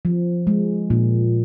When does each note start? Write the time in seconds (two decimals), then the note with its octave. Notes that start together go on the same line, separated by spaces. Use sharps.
0.05 F3
0.47 G#3
0.90 A#2